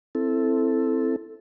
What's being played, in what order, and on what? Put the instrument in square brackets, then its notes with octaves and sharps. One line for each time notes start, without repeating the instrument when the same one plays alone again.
[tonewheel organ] C4 E4 A4